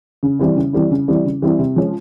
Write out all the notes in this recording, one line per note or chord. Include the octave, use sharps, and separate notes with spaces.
C#3
E3 G3 C4 E4
C#3
E3 G3 C4 E4
C#3
E3 G3 C4 E4
C#3
E3 G3 C4 E4
C3
F3 G#3 C#4